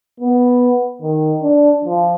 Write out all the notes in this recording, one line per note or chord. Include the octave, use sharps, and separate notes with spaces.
B3
D#3
D4
F3